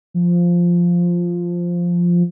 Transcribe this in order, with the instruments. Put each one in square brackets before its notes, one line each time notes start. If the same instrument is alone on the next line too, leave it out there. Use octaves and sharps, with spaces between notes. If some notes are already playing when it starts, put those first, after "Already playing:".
[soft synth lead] F3